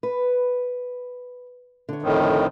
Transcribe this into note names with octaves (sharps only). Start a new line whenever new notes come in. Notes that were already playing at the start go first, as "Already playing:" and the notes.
B4
D3 C#5
F2 A2 D#3